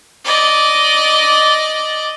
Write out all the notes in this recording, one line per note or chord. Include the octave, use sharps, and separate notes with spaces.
D5 D#5